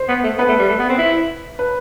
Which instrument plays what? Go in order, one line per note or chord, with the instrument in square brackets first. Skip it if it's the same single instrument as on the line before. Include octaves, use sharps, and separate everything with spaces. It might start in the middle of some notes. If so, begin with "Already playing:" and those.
Already playing: [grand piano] C5
[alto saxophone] B3
A3
[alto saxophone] B3 [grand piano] B4
[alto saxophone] A3
G3
A3
B3
C4
E4
[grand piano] B4